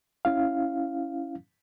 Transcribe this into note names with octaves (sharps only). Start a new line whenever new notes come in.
C#4 E4 F5